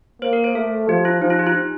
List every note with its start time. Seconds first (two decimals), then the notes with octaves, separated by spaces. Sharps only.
0.22 A#3 C5
0.33 A#4
0.44 C5
0.55 A3 A4
0.89 F3 G4
1.05 F4
1.22 F3 D#4
1.30 F4
1.39 G4
1.47 F4
1.55 D#4